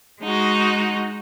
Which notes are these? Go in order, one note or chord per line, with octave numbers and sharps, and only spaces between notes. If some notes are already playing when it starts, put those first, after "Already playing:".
G#3 D#4 F#4